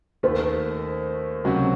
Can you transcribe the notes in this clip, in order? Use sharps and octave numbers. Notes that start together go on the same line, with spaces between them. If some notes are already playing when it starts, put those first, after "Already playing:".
D#2 D#3 A3 C5
C#2 C3 F#3 C#4 F#4